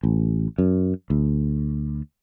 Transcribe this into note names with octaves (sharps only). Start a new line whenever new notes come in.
A1
F#2
D2